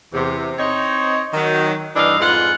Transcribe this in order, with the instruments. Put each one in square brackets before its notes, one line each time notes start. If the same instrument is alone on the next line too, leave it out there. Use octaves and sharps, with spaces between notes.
[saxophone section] E2 C3
C4 D#4 C#5
D#3 F#3
G2 E3 D4 D#4 A4 F5
F2 G#2 G#3 F4 B4 F#5